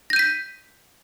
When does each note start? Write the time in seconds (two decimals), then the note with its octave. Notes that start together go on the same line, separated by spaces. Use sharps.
0.10 A#6
0.13 G6
0.16 D#7
0.19 B6